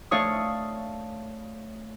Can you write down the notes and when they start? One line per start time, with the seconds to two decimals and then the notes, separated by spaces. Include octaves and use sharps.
0.11 A3 D4 C#5 F5 D#6